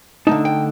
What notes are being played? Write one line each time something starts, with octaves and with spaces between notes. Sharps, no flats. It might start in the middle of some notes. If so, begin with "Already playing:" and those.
D3 A3 D#4 A5
G5